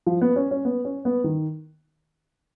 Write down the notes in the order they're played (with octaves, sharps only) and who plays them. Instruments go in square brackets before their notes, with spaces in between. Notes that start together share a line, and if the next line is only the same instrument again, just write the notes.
[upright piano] F3
B3
C#4
C#4
B3
C#4
B3
D#3